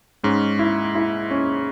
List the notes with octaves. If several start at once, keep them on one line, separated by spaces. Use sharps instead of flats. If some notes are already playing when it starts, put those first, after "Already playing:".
G#2 G#3 C#4
E4
E4
C#4